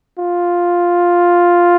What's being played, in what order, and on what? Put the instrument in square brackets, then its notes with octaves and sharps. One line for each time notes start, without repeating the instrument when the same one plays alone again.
[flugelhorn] F4